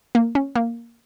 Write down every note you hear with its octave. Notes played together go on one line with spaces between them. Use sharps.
A#3
C#4
A#3